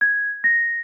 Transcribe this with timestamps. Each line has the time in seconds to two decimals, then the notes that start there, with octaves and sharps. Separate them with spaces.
0.01 G#6
0.44 A#6